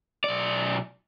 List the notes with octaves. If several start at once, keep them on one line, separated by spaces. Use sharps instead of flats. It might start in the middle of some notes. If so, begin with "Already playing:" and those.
B1 D5